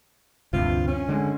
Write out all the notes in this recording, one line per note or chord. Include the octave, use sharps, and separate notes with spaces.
D2 G2 C3 F4
C#4
D3 G#3